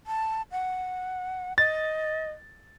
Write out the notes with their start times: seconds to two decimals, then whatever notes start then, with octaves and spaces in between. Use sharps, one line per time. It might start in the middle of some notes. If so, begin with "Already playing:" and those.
0.07 A5
0.52 F#5
1.58 D#5 A6